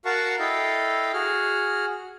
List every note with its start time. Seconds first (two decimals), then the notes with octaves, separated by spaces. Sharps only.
0.05 F#4 A#4 F5 F#5 A5 C#6
0.39 E4 A4 D#5 F5 G5
1.14 F#4 G#4 F6